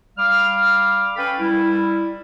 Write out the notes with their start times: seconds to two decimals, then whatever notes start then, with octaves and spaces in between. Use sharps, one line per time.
0.18 G3 F5 D6 F6
1.16 C#4 A4 B4 F5 G5 B5
1.40 G3 E4